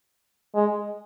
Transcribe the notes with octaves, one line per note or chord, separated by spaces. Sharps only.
G#3